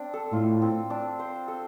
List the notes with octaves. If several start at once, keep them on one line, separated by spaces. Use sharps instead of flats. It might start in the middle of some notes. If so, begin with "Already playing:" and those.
Already playing: C4 D4
A4
A2 F4
C4
D4
C5
A4